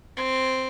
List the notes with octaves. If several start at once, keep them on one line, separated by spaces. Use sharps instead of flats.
C4